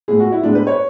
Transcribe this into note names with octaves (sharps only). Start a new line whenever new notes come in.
A2 G#3 B3 G#4
F#4
E4
A2 G#3 B3 D4
B4
C#5